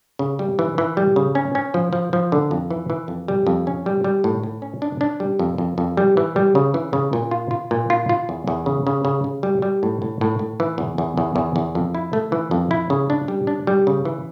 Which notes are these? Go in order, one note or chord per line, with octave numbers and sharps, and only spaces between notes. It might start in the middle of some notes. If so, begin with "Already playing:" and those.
C#3
G3
E3
E3
G3
C#3
C#4
C#4
F3
F3
F3
D3
F2
E3
E3
F2
G3
F2
C#4
G3
G3
A2
A2
C#4
D4
D4
G3
F2
F2
F2
G3
E3
G3
C#3
E3
C#3
A#2
F4
F4
A#2
F4
F4
E2
E2
C#3
C#3
C#3
C#3
G3
G3
A2
A2
A2
A2
E3
E2
E2
E2
E2
E2
F2
E4
A3
E3
F2
E4
C#3
D4
G3
D4
G3
C#3
E3